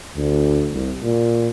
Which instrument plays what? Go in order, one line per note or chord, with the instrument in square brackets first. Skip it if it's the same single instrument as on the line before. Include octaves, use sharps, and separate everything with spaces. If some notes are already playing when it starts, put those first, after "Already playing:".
[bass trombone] D2
C2
A#2